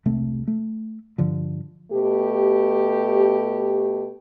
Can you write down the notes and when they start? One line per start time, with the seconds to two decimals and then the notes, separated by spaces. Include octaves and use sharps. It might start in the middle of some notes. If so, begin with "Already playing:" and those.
0.05 E1 C2 C3 A3
0.47 A3
1.18 G2 D3 F3
1.92 B2 A3 G4